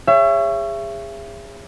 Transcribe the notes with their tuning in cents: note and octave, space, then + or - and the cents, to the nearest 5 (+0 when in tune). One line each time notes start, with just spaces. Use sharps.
G#4 -30 C#5 +0 E5 +35